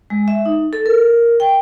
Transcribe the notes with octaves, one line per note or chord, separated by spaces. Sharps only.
G#3
E5
D#4
A4
A#4
G5